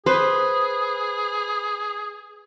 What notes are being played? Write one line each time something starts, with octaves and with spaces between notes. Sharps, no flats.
G#4 B4 C5